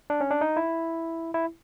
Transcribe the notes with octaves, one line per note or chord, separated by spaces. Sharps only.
D4
C#4
D4
D#4
E4
E4